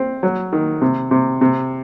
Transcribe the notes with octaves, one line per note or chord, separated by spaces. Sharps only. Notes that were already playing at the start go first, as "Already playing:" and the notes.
Already playing: C4
F#3
D#3
C3
C3
C3